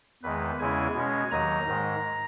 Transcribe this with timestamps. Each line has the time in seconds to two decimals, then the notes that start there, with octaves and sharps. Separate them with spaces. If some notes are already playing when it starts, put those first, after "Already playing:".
0.23 E2 D#3 G#3 B4
0.59 E2 C#3 G#3 C#4 E4 G#5
0.95 B2 G#3 C#4
1.31 D#2 D#3 F#3 A#5
1.67 G#2 D#3 G#3